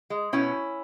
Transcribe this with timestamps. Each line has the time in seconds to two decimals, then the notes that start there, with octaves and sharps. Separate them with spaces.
0.10 G#3
0.33 B2 C#4 E4